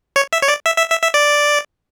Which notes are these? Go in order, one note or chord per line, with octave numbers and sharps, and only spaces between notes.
C#5
E5
C#5
D5
E5
E5
E5
E5
D5